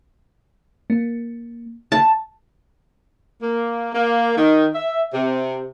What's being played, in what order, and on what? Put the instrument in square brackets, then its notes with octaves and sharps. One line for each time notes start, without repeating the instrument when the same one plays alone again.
[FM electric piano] A#3
[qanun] A5
[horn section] A#3
A#3
D#3
E5
C3